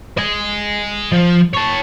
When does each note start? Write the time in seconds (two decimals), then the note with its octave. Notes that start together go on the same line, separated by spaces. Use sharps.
0.18 D#5 G#5
1.12 F3
1.53 C#5 A5